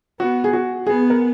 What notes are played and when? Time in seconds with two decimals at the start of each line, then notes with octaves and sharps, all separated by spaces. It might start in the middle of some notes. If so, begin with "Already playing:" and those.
0.20 B3 F#4
0.44 G#4
0.53 F#4
0.87 B3 G#4
1.10 A#4